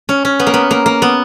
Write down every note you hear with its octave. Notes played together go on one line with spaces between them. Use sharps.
C#4
C#4
B3
A#3
B3
A#3
A#3
B3